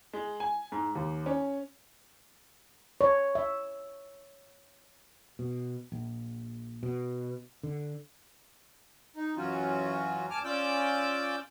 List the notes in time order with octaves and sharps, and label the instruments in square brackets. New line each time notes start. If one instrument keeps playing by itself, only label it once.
[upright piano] G#3
G#5
G#2
D#2
C#4
[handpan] C#5
E5
[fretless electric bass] B2
A#1
B2
D3
[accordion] D#4
F#2 E3 F#3 C#4 F4 F#4
D2 G#5 A5 D6 F6
C#4 F4 D5 D6 E6 G6